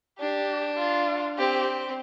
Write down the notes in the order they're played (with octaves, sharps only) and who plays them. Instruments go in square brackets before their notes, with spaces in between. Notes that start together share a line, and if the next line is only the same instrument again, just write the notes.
[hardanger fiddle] D4 [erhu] G4
[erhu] F4
[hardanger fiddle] C4 [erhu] G4